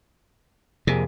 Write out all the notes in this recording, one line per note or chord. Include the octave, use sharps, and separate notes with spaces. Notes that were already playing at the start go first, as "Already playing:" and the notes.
F2 C3 A#3 G#4